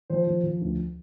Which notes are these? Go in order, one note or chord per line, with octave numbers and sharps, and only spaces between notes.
F3 C5
F3
F3
D2